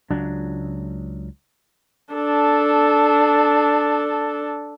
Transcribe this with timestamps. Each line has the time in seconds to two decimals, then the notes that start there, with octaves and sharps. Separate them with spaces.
0.11 C#2 F#3 D4
2.14 D4 A4